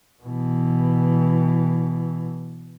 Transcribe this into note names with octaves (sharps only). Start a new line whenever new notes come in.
B2 E3